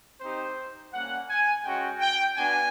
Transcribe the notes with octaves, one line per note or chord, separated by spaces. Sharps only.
C4 D#4 G4 C5
G3 A#3 C#4 F#5
G#5
G#3 C#4 F#4 G5
G5
B3 D4 F#4 G#5